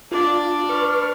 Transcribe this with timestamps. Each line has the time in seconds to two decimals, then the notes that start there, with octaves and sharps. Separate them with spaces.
0.11 D4 F4 D5
0.69 B4 C#6 F6